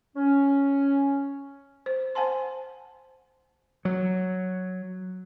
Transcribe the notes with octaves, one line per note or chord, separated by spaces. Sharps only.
C#4
C5
C5 F#5 G#5 A5 C6
F#3